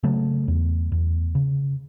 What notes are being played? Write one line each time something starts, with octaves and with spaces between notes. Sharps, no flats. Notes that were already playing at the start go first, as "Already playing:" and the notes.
C#3 F#3 A3
E2
E2
C#3